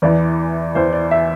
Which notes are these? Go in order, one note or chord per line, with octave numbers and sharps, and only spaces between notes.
E2 E3 D5
E2 E3 C5
D5
E5